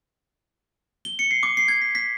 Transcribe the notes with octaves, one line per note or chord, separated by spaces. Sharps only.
G7
C#7
C7
D6
C7
G#6
B6
B6